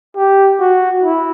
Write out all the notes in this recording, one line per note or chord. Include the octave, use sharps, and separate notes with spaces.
G4
F#4
E4